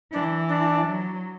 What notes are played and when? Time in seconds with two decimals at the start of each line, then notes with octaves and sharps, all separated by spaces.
0.12 E3 D4
0.49 D4
0.85 F#3